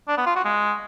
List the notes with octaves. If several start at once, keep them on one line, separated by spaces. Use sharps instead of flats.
D4
B3
F4
F#4
G#3